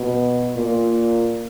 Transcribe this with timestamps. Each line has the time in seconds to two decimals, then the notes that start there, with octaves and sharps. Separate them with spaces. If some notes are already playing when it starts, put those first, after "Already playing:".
Already playing: B2
0.56 A#2